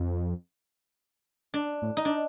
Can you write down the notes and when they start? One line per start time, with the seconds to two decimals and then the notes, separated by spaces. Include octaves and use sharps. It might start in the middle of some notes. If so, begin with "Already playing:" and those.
Already playing: F2
1.54 D4
1.82 A2
1.97 D#4
2.05 D4